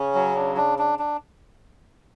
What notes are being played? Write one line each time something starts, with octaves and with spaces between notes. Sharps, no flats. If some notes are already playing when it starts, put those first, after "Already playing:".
Already playing: C#3 C#4
F#3
D4
D4
D4
D4